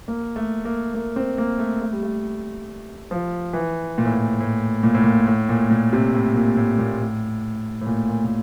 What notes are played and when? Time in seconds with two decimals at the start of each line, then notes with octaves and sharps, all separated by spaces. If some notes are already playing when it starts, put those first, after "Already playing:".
0.08 A#3
0.36 A3
0.65 A#3
0.94 A#3
1.16 C4
1.38 A#3
1.59 A3
1.81 A3
1.92 G3
2.03 A3
3.11 F3
3.53 E3
3.98 A#2
4.05 A2
4.14 A#2
4.40 A2
4.83 A#2
4.94 A2
5.03 A#2
5.27 A2
5.49 A#2
5.71 A#2
5.93 C3
6.14 A2
6.35 A#2
6.57 A2
6.78 A#2
7.00 A2
7.81 A2
7.87 A#2
8.09 A#2
8.24 A#2